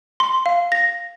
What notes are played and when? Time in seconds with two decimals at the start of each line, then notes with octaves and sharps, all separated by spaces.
0.20 C6
0.46 F5
0.72 A#6